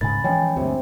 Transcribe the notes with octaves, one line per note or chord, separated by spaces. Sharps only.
D1 G#2 C#3 G#5 B5 A6
E3 F3 G#3 C#4 C#5 G5 G#5
D2 G2 C3 C5